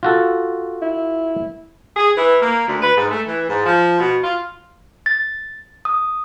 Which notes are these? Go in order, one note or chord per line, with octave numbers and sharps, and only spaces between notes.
F4 F#4 A4
E4
G#4
E3
A#3
D2
B4
G#2
A3
E3
G#2
F3
B2
F4
A6
D#6